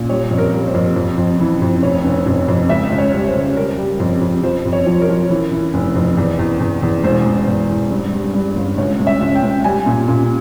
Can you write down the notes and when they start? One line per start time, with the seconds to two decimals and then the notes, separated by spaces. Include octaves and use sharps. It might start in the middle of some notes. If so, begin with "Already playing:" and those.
Already playing: A#2
0.09 G3 C#5
0.31 F2
0.38 A#4
0.52 G3
0.67 C5
0.74 F2
0.96 F2
1.18 F2
1.39 E3
1.62 F2
1.83 F1 C#5
2.05 F1
2.26 F2
2.48 F2
2.69 C#2 E5
2.92 C#2
2.98 C#5
3.13 G3
3.28 C5
3.35 C#3
3.57 G3 A#4
3.78 G3
4.00 F2
4.21 F2
4.43 F3 C5
4.65 F2
4.73 C#5
4.86 F3
5.01 A#4
5.09 F3
5.30 E3
5.52 E3
5.74 F1
5.95 F2
6.17 E2
6.39 E2
6.60 E2
6.82 E2
7.04 E1 C5
7.26 E1
7.48 E2
7.69 E2
7.90 G2
8.12 G2
8.34 G2
8.56 G1
8.78 C#2 C#5
8.99 C#2
9.07 E5
9.21 C#2
9.35 G5
9.43 C#2
9.64 G3 G#5
9.86 A#2
10.08 A#2